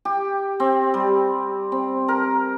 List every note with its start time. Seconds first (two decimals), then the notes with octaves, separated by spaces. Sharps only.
0.05 G4
0.60 C4
0.94 G3
1.72 C4
2.08 A#4